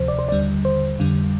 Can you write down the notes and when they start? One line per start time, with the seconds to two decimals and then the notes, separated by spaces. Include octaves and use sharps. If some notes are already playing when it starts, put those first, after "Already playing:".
Already playing: D2 C3 F3 C5
0.08 D5
0.19 C5
0.29 D#2 D3 G3 D5
0.65 C5
0.99 F2 D3 G3